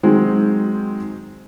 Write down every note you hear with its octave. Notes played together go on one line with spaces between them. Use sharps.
D#3 F#3 G#3 C4